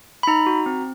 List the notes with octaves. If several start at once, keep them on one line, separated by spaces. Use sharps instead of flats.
B5
D#4 A#5
F#4
C4